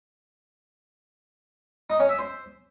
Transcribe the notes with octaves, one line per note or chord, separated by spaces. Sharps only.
D#4
C#4
E5
C5